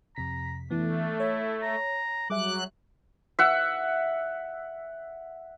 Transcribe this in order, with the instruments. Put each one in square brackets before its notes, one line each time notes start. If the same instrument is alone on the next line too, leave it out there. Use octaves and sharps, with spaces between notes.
[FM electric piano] F2 C3 B6 [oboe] A#5
[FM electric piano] E3 B3 [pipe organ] A3 [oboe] D4
[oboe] E4 [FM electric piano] C#5
[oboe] A#5
[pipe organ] F#3 F#6 [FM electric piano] G3 G#4 E5 [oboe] D6
[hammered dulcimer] E5 F#5